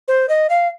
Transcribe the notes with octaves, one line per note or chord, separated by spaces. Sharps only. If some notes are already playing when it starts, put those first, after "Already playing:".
C5
D#5
F5